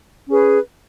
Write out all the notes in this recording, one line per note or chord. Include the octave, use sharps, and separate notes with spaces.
C#4 G#4 B4